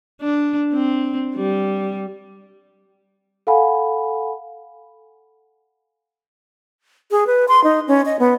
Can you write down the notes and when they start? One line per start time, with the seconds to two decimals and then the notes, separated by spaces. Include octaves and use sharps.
0.21 D4
0.73 C4
1.35 G3
3.47 A4 F5 F#5 G#5 B5
7.11 G#4
7.27 B4
7.48 C6
7.64 D#4
7.88 C#4
8.05 D#5
8.19 B3